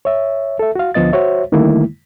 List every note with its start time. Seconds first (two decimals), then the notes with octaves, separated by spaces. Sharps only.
0.05 C#5 E5
0.59 A4 E5
0.75 F#4 F5
0.94 D2 D3 F3 B3 D#5 A6
1.13 F#4 C5 C#5 E5
1.52 D3 D#3 G3 A3 A#3 E4